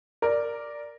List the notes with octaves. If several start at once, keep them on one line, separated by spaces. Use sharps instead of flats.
A#4 D5